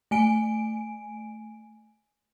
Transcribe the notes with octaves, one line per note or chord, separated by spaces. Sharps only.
A3 G#5 D7